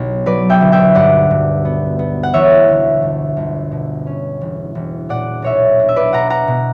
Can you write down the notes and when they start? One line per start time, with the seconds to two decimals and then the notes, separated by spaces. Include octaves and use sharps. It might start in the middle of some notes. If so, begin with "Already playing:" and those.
Already playing: B1 B2 A#3 G4
0.26 F#3 B4 D5
0.50 E5 G5
0.61 D2
0.72 E5 G5
0.95 G2 D5 F#5
1.31 G2
1.65 B3
1.99 B3
2.23 F#5
2.33 E3 C#5 E5
2.68 D2
3.02 G1
3.37 G1
3.72 B2
4.07 C#4
4.41 E1
4.75 E1
5.09 A#2 D5 F#5
5.42 B1 C#5 E5
5.79 D4
5.89 E5
5.96 B4 D5
6.13 B2 F#5 A#5
6.30 F#5 A#5
6.48 B2